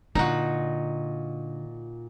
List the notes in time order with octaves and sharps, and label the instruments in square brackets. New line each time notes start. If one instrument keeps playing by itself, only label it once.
[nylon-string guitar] A#2 F4 [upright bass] D3 [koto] D#4 F#4